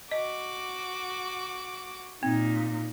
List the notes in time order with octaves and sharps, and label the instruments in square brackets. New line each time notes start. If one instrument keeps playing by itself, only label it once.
[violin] F#4 D6 [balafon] D#5
[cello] A#2 D#4 [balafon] C4